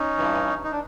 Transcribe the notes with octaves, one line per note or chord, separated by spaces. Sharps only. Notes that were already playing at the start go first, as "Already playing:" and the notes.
Already playing: C#4 D#4
G2 E3
D#4
D4